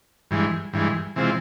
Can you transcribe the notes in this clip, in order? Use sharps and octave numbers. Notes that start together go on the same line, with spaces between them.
G2 E3 G#3
G2 E3 G#3
C3 E3 G#3 C4 F4